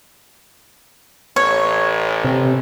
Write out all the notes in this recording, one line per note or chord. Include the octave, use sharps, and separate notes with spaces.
A1 C#5
C3